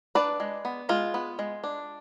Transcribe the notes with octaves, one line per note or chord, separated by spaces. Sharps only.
D4 B4 D5
G#3
B3
G#3 F4
B3
G#3
D4